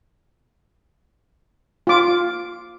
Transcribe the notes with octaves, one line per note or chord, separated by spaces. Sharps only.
F4 D6